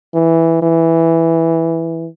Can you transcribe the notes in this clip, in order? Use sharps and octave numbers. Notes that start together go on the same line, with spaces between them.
E3
E3